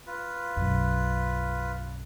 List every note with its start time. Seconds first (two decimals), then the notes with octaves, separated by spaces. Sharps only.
0.07 F4 B4
0.56 B1 F#2